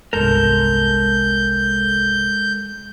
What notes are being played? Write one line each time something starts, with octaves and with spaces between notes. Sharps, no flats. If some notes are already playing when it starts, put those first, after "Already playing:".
G1 C2 G#3 A4 A#4 G6